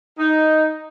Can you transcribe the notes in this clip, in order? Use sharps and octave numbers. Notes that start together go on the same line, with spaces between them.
D#4